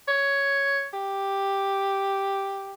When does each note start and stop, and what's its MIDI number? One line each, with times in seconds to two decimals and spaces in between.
0.08 0.86 73
0.94 2.73 67